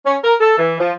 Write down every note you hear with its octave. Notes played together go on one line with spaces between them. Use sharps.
C#4
A#4
A4
E3
F3